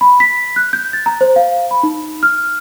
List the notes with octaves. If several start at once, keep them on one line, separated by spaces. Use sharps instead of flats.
B5
B6
F#6
G6
A6
A#5
C5
F5
B5
D#4
F6